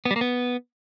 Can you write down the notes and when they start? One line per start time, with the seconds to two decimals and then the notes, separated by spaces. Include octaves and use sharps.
0.05 B3
0.11 G3
0.16 A#3
0.21 B3